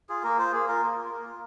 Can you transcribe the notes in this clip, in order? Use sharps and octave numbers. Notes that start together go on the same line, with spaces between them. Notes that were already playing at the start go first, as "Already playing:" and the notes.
F4 G#4
A#3 A#4
F4 C5
A#3 G#4
F4 A#4
A#3
F4
A#3
F4